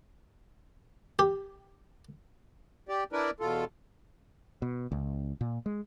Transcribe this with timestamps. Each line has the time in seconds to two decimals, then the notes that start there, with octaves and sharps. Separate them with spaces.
1.19 G4
2.89 G4 D5
3.13 D4 E4 A#4 B4 D5
3.40 E2 B2 F4 A4
4.62 B2
4.92 C#2
5.41 A#2
5.66 G#3